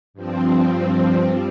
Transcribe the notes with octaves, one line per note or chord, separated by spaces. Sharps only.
G2 F3 C4
G3